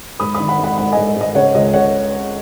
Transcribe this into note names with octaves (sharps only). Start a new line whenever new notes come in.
G#2 B5 D#6
B5 D#6
D#3
F#5 B5
G#2 F#5 B5
G#2 F#5 B5
G#2 D#5 G#5
D#5
G#2
D#5
C#3 C#5 F#5
C#2 D#5
C#3 C#5 F#5